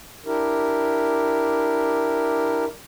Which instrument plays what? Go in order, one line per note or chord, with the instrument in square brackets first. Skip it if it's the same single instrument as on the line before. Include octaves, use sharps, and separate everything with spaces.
[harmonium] D4 E4 G4 A#4